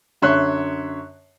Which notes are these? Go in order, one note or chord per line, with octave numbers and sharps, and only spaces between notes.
F#2 D3 C#5 E5 C6 F#6